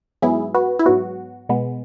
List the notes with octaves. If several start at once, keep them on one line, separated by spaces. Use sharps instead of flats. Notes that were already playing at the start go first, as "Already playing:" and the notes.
G#2 F#3 B3 E4 G#4
F#4 B4
E4
G#2 F#3 B3 F#4
B2 G#3 B3